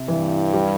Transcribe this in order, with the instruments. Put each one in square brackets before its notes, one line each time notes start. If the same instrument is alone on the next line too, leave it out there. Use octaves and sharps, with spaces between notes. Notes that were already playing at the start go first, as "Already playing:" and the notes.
Already playing: [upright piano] C3
[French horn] G2 [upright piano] E3
[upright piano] G3